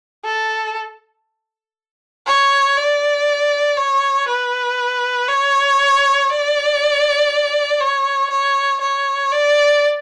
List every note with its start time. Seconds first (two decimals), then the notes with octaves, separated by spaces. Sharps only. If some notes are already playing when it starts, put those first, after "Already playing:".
0.25 A4
2.26 C#5
2.77 D5
3.77 C#5
4.28 B4
5.28 C#5
6.30 D5
7.80 C#5
8.31 C#5
8.81 C#5
9.31 D5